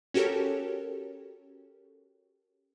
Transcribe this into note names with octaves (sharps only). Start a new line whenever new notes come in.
C#4 F#4 G4 A4 A#4 C#5